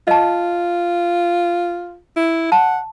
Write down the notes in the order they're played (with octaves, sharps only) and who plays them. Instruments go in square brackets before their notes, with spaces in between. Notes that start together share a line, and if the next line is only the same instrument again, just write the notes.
[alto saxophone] F4 [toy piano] D#5 A5
[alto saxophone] E4
[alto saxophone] F#5 [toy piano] A5